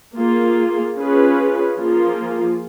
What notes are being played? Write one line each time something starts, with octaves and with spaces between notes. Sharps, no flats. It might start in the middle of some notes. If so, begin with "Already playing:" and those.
A#3 F4 G#4
C#4 F4 G#4 B4
F3 A#3 F4 G#4